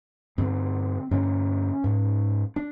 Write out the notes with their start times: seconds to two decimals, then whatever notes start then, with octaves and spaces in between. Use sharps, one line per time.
0.38 G2 D3 C4
1.11 G2 D3 C#4
1.84 G#2
2.56 D4